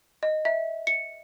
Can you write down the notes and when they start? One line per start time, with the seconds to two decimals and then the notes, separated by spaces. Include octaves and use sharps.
0.23 D#5
0.45 E5
0.87 C#7